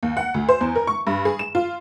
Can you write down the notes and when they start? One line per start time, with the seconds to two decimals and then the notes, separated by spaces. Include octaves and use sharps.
0.03 D#2
0.17 F#5
0.34 D2
0.49 C5
0.61 E2
0.75 A#4
0.87 C#6
1.07 G2
1.25 G#4
1.39 E7
1.55 F4